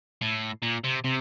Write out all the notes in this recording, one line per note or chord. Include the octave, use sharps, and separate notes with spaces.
A2
A#2
C3
C3